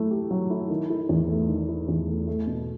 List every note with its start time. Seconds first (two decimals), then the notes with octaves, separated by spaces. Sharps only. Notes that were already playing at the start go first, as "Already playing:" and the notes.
Already playing: F#3 A3 E4
0.11 G4
0.31 F#3
0.50 E4
0.70 D#3
0.90 E4
1.09 E2
1.29 A3
1.48 D#3
1.69 E4
1.88 E2
2.08 A3
2.27 A3
2.47 B2